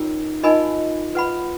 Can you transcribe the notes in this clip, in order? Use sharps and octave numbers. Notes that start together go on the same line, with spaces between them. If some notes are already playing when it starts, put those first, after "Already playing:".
Already playing: C#4 D#4 F4 A#4 C#5
D#4 F4 A#4 D#5 G#5 B5
F4 B4 F#5 B5